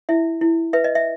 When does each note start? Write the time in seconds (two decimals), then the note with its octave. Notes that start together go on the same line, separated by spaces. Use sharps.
0.09 E4 E5
0.41 E4
0.73 B4 E5
0.84 D#5
0.95 E5